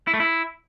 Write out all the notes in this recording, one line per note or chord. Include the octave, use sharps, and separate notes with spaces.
E4
A3
E4